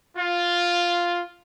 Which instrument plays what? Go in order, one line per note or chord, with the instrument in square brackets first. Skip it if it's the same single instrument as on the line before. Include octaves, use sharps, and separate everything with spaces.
[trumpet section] F4